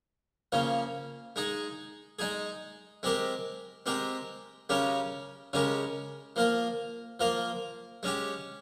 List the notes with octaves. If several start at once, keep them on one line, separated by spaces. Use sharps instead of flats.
C#3 F3 A#3 C#4
G#3 D#4 G#4
G#3 D#4 G#4
G#3 C4 G4 A#4
G#3 C4 G4 A#4
C#3 G#3 C#4 G4 A#4
C#3 G#3 C#4 G4 A#4
F3 A#3 F4 A#4
F3 A#3 F4 A#4
G#3 C#4 G4